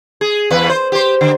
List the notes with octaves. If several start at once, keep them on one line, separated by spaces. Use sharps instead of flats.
G#4
E2 B4
C5
G4 C5
D3